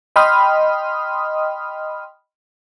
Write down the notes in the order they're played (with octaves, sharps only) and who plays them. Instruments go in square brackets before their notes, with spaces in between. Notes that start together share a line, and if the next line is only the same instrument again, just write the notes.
[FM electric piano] D#5 G5 B5 C6 D#6 F6